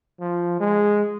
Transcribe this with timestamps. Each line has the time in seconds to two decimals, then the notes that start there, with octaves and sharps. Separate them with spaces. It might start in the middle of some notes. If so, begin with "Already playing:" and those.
0.20 F3
0.60 G#3